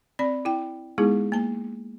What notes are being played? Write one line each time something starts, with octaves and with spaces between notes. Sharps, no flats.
C4 D5 B5
E4 G5
G#3 B3 D#4 E4 G#4
A#3 A5